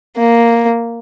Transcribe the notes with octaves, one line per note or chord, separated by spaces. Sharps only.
A#3